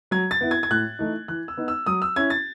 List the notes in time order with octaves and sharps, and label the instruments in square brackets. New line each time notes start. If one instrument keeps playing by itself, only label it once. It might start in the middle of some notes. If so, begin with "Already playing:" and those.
[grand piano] F#3 G#6
A6
B3 E4
G#6
G#6
A2 F#6
E3 A3 D#4
E3 F#6
E6
B3 D#4
E6
F#3 D#6
E6
C#4 E4 G#6
A6